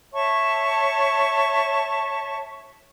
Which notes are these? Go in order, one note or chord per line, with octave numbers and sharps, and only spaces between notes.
C#5 E5 A5 C#6